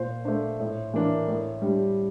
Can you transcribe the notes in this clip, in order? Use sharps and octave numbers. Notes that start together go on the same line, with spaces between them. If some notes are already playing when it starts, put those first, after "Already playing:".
Already playing: A#2 C5
A3 D4 C5
A2
E3 A#3 D4
A2
G3 D4